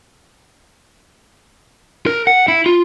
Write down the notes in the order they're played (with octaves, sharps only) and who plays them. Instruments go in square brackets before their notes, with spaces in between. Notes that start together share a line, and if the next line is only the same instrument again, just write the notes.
[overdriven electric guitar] A#4
F#5
E4
F4